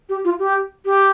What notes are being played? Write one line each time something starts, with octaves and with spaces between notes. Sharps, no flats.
G4
F4
G4
G4